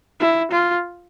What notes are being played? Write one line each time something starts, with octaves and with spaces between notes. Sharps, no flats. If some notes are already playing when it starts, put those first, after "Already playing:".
E4
F4